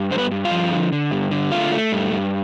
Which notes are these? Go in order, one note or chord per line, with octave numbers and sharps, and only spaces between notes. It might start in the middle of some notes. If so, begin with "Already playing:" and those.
Already playing: G2
D3 C5
B3 B4
G2
F4 F5
F3
D3
D3
G2
D3
A3 F4 F5
A3
G2
G2